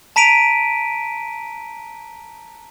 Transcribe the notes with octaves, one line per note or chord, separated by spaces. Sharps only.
A5 A#5 B6 D7 D#7 F7